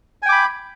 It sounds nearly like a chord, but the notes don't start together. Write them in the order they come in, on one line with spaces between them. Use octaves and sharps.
G#5 G5 D6 B5